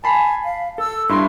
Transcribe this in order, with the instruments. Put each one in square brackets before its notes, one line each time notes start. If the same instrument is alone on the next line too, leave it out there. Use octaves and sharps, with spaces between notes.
[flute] G#5 [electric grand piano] A5 B5 C7
[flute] F5
[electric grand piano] A4 [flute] E6
[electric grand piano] G2 E4 [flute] C6